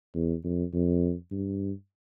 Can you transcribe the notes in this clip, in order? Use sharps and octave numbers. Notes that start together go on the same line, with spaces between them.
E2
F2
F2
G2